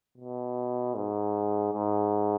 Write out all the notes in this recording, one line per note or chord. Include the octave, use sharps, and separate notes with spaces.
B2
G#2
G#2